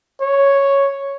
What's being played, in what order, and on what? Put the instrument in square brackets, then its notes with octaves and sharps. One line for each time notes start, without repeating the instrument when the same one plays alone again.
[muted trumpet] C#5